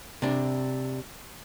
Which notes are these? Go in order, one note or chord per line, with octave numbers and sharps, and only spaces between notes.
C3 D4